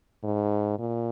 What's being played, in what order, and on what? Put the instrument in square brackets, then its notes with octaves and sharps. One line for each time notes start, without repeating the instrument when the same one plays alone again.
[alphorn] G#2
A#2